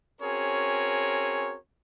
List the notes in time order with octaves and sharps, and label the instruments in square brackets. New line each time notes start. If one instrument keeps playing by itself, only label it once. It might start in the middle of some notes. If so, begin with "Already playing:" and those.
[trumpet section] C4 C#4 F#4 G#4 A#4 C#5